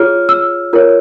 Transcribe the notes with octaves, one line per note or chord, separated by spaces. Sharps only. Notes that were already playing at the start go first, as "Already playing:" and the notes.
Already playing: F4 G#4 C#5 F6
E6
F4 A#4 C#5